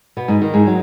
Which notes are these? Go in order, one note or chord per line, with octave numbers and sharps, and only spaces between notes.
B2 B3
G#2 G#3
D#3
G#2 G#3
F#3